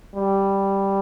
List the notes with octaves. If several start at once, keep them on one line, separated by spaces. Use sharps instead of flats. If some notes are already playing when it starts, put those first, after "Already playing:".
G3